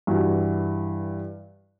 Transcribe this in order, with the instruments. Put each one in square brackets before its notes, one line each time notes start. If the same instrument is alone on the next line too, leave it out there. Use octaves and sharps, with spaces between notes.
[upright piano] G2 E3 F#4